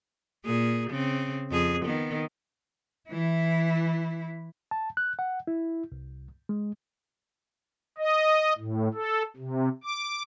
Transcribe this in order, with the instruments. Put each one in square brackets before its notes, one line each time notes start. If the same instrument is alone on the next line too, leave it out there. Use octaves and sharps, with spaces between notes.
[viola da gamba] A#2 G#4
C#3 C4
F2 G#4
D#3 B3
[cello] E3 E4
[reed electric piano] A5
F#6
F#5
E4
C2
G#3
[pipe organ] D#5
A2
A4
C3
D6